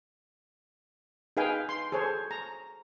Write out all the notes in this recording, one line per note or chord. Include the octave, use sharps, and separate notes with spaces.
D#4 G#4 B4 F5 G5 G#5
C6
G#4 A4 C5 C#5
A#5